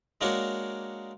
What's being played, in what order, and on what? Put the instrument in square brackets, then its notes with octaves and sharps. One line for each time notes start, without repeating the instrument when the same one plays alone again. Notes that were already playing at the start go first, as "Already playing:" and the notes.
[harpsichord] G#3 A#3 D4 F#4 A#4 C#5